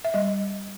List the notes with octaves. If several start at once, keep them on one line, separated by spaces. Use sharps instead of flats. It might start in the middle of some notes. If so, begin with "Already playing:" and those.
E5
G3 D#5